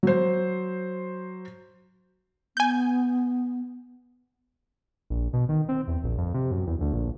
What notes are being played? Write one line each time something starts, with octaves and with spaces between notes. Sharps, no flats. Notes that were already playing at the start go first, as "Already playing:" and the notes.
F#3 C5
B3 G#5 G6
A#1
B2
D#3
C4
E2
A#1
F2
C3
F#2
E2
D2
A#1